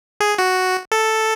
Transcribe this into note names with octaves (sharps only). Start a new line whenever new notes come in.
G#4
F#4
A4